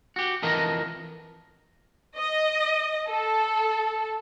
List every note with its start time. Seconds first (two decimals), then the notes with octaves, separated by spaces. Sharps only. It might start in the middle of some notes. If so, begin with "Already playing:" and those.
0.16 F#4 G4
0.43 F2 E3 A#4 D#5 A5
2.18 D#5
3.10 A4